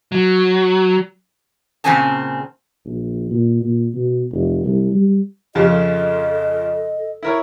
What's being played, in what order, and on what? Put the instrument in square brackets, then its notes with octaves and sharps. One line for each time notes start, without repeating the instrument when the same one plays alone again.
[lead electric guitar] F#3
[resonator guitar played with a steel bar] A#2 C#3 C4 C#4 G#5 A5
[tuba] A#1
A#2
A#2
B2
F1
C2
G3
[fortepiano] F2 C#3 F3 [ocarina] G4 [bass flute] D#5
[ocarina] A4
[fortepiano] E4 A#4 C#5